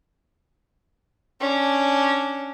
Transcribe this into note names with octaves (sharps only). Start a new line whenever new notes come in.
C#4 D4